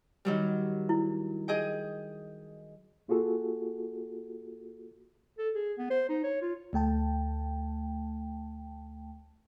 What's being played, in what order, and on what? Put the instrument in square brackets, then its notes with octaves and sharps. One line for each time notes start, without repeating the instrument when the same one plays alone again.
[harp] D#3 F#3 G3
[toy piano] E4
[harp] G#4 D#5 G5
[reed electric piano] A#3 F4 F#4 G#4 A4
[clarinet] A4
G#4
B3
C5
D#4
C#5
F4
[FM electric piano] D2 A3 G5 A5